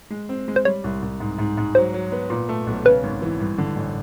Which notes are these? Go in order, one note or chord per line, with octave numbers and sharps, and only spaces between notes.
G#3
C4
G#3
C5
G3 C#5
C2
C2
G#2
G#2
G#2
F#3 C5
F#3
B3
A#2
A3
B1
C#3 B4
G#1
E3
G2
D3
A1